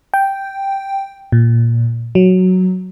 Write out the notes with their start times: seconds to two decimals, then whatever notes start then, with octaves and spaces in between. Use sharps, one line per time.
0.14 G5
1.32 A#2
2.15 F#3